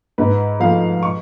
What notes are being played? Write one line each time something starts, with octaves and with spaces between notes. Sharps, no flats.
G#2 B4
F3 A3 F5
C#6